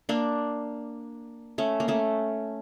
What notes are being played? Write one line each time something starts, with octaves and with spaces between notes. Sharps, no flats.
A#3 D4
A3 C#4
A#3
A3 C#4